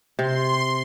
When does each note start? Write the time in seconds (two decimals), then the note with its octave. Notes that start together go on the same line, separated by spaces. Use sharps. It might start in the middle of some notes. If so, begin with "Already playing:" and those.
0.19 C3 C6